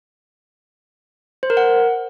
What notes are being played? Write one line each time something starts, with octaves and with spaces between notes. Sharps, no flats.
C5
A#4
F#5